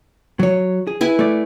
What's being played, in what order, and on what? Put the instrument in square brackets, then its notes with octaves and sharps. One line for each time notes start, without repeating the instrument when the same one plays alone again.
[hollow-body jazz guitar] F#3 C#5
G#4
[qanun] E4 B4 G#5
[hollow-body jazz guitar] A3 D5